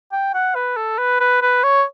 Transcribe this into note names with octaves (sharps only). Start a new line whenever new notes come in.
G5
F#5
B4
A4
B4
B4
B4
C#5